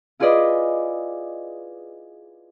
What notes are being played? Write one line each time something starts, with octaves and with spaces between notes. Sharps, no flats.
E4 F4 G#4 B4 D5 D#5